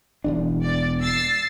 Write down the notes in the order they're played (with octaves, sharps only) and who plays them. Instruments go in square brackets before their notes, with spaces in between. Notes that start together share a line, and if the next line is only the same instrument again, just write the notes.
[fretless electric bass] E1 E2 D4
[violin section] D5
E6 A6 C7